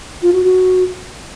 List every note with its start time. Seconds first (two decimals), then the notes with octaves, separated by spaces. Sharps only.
0.22 F4
0.33 F#4
0.44 F#4